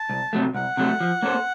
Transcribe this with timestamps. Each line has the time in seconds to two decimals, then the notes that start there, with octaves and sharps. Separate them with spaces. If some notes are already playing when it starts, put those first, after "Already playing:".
Already playing: A5
0.10 C2
0.33 C3 F#3 A3
0.55 C2 F#5
0.77 C3 F#3 A3
1.00 F3
1.23 A#3 C#4 A4 C5